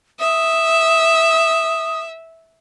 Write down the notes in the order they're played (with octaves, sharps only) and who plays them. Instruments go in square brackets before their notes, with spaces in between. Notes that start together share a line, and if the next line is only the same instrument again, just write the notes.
[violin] E5 [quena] D#6